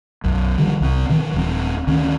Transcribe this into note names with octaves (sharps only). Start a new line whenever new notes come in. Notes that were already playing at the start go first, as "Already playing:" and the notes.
B1 F#2
D3 D#3 F3 G3
C2 C4
B2 D#3 E3
D#1 C4
D2 D#3 C4 C#4